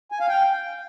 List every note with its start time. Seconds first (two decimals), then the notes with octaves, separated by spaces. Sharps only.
0.12 G#5
0.20 F5
0.29 G5